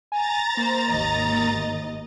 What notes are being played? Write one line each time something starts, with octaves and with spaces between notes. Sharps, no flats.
G#5 A#5 A6
A#3 C5
G#1 D#2 D#5